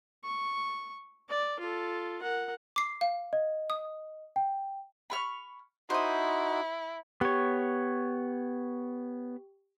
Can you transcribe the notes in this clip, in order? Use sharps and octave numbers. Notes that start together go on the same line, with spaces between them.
C#6
D5
F4 A4
A#4 F#5
D6 C7
F5
D#5
D#6
G5
B5 C#6 F6
D#4 E4 F#4 C5 D#6
B3 G4 C#5 G5 C#6